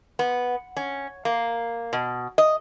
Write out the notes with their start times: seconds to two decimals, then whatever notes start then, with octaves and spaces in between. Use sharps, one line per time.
0.19 B3
0.77 C#4
1.25 A#3
1.93 B2
2.38 D#5